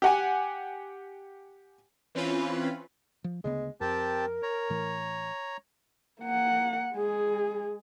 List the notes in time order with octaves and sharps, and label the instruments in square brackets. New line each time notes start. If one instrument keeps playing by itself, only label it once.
[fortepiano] G4 F#5 G#5
[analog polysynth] E3 C4 C#4 F4 B4
[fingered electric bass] F3
[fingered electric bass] D2 C#3 B3 [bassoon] G#3
[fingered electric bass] F2 [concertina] C4 G4 A5 [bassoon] A#4
[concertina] C#5 A#5
[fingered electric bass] A2 E3
[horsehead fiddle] A#3 F#5
G#3 G#4